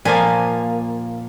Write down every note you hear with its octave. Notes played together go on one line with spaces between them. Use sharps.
A#2 F3 A#3 G#5